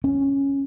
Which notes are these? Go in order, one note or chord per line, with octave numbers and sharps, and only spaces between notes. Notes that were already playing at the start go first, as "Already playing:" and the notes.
C#4